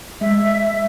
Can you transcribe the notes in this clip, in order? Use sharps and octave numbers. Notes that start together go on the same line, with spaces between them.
G#3 E5